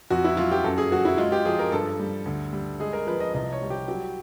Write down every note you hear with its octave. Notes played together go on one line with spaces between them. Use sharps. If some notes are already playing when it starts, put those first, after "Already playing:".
F2 F#4
E4
F#3 F4
G4
F#2 A4
G#4
F#3 F#4
E4
G#3 F4
G4
F3 G#4
A#4
G2 A4
G3
D2
G3
G#3 G#4
A#4
F3 B4
D#5
C2 D#5
C#5
G3
G4
F#3 G4